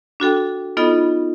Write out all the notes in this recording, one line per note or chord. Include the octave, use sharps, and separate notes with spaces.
D4 F#4 A4 G5
B3 D#4 F4 A4 D#5 B5